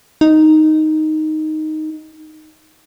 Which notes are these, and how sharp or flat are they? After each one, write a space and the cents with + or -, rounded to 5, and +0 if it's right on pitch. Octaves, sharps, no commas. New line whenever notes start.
D#4 +0